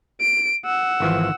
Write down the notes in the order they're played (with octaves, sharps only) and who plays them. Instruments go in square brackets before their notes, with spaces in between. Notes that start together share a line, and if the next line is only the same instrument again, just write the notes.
[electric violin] D7
F#5 E6
[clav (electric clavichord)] G#1 E3 F3